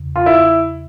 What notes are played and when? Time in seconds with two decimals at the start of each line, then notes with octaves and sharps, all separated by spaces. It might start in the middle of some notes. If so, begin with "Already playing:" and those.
Already playing: E2 C#3
0.16 F4
0.26 E4